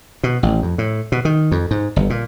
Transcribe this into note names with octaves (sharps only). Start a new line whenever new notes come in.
B2
A1
F2
A2
B2
D#3
F2
G#2
G1
A#2